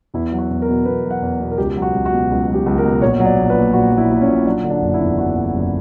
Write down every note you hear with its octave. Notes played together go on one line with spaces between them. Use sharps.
E2 E4
F#3
F#4
E2
A#4
B2
E2 B4
F#3
F#5
E2
B2
A#4
C#2 G4
F#3
F#4
C#2
F#4
B2
C#2
F#3
G4
C#2
A#4
B2
A#1 C#5
F#3
D5
A#1
B4
A#2
A#1 F#4
F#3
E4
A#1
C#4
A#2
F#3 D4
D3
D4
F#1
E4
E2
F#3 F#4
D3
F#1